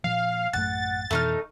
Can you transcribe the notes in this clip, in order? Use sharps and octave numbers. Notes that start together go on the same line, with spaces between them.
A#2 F3 F5
A1 F#2 A3 F#5 A6
F2 B2 E3 A3 D#4 F6